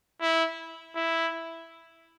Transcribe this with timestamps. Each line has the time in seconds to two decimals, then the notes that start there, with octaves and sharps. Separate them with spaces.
0.21 E4
0.96 E4